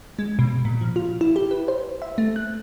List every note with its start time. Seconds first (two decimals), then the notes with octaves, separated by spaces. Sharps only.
0.19 G#3
0.39 B2
0.65 A#2
0.81 F3
0.96 F4
1.21 E4
1.36 G4
1.51 B4
1.68 C5
2.02 E5
2.18 A3
2.36 F#6